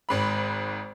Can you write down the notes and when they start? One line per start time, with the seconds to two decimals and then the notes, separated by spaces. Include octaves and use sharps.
0.09 G#1 G#2 B5